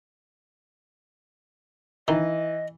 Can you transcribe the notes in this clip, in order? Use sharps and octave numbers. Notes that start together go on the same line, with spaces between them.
D#3 E3 D#5